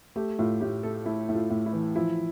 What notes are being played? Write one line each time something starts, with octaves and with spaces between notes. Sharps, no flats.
A3 G4
A2 F4
A2 G4
A3 A4
A3 E4
A2
F4
A2
E4
E3
F3 E4